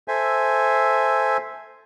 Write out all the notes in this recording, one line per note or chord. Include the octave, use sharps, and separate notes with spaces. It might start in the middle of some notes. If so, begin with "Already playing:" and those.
A4 C5 E5 G#5